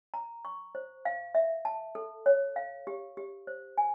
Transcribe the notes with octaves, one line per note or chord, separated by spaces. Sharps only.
A#5
C#6
C5
F5
E5
A5
A4
C#5
F5
G4
G4
C5
G#5